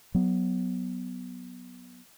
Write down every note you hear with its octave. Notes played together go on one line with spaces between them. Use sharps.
F#3 B3